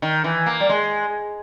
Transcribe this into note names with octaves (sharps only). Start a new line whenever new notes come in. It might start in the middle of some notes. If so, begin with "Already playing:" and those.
D#3
E3
A#3
G3
G#3